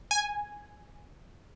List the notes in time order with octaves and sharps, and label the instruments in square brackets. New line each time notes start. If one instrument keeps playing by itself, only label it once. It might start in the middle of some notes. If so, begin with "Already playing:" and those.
[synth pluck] G#5